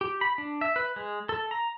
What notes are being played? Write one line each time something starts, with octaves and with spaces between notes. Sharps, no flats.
G4
B5
D4
E5
B4
G#3
A4
A#5